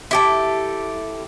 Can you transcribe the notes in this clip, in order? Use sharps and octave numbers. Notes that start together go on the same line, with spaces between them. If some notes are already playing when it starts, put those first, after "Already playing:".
E4 G4 A4